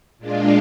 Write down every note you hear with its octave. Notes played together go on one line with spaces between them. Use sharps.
A#2 G#3 D4 F4